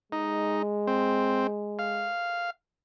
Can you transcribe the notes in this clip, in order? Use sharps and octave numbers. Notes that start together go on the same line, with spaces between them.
G#3 D#4
C4
F5